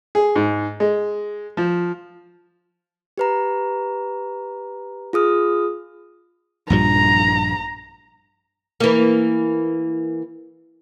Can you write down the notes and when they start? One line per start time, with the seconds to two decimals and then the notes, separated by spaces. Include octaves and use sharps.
0.15 G#4
0.36 G#2
0.80 G#3
1.57 F3
3.18 G4 B4 A#5
5.13 F4 G#4 D#6 F6
6.70 A#1 G2 F3 A#5
8.80 E3 A#3